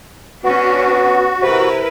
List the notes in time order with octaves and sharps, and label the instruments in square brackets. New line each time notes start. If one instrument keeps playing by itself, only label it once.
[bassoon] B3 [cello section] C#4 D4 [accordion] F#4
[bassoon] B3
[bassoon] C3 [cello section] E4 A#4 B4